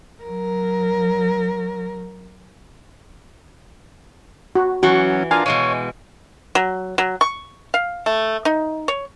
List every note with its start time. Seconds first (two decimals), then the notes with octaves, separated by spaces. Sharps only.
0.23 F#3 A#4
4.55 F#4
4.83 E3 F#3 C#4 F#4 F#5
5.31 D4 F4 A#4 F5 G#5
5.46 B2 E3 G#3 C#5
6.55 F#3
6.98 F#3
7.21 C#6
7.74 F5
8.06 A3
8.45 D#4
8.88 C#5